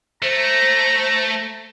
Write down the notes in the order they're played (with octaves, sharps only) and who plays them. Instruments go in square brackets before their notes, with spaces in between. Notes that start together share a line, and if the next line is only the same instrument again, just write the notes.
[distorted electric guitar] A3 [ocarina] C5 [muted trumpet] A#5